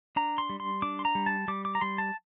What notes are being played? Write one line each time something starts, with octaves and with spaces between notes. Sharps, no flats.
D4 A#5
C6
G3
C6
D4 D6
C6
A#5
G3
A5
G3 D6
D6
A#5
G3 C6
A5